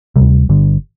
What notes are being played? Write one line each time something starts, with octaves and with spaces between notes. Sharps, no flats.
D2 C3 G3
G1 G2 D3